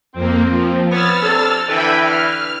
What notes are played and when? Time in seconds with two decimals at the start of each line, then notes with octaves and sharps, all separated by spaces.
0.14 F2 A#3 C4
0.48 F3
0.91 B3 C#5 E6 F6 A6
1.21 C3 D4 A4
1.68 D3 E3 E5 G5 B5
2.02 F6